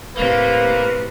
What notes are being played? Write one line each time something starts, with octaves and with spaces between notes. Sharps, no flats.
D1 A2 C3 A#3 B4